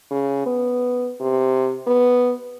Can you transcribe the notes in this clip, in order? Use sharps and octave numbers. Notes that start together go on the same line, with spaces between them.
C#3
B3
C3
B3